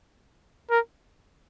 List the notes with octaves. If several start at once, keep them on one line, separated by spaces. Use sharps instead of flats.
A#4